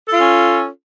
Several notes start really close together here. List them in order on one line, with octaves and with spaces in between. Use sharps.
A4 F4 C#4